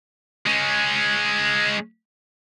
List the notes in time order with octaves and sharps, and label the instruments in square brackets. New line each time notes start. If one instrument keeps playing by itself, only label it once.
[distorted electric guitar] G#3 C#4